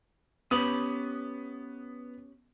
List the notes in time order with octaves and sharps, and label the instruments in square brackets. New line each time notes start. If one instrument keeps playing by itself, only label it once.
[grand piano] B3 D#6 [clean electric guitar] C#4 G4 B5